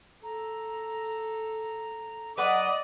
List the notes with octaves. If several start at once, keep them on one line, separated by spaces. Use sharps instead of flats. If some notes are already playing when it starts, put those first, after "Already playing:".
A4 A#5
F#3 B4 D5 D#5 F#5 D#6